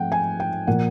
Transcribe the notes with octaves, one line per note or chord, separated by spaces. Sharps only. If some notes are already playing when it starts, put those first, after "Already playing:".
Already playing: G#2 F3 A3 C4 F#5 G5
G#5
G5
A#2 F3 A#3 F#5